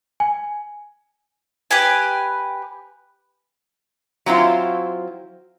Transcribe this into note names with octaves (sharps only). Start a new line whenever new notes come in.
G#5
G4 B4 G#5
F#3 C4 E4 F4